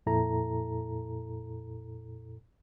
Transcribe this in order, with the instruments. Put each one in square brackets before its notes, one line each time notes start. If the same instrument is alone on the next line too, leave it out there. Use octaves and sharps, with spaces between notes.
[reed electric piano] F2 A#2 E4 A4 A#5